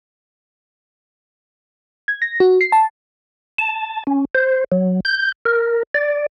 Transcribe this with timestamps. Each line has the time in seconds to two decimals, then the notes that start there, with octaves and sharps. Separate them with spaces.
2.08 G#6
2.22 A#6
2.40 F#4
2.61 C7
2.72 A5
3.59 A5
4.07 C#4
4.35 C5
4.72 F#3
5.05 G6
5.45 A#4
5.94 D5